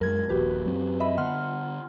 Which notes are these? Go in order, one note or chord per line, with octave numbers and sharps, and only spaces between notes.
F#2 G#3 A#4 G#6
D#1 A#1 F#4 G4 B4
F#2 F#3 C4
D#5 E5 B5
D3 B3 F#5 C6 F6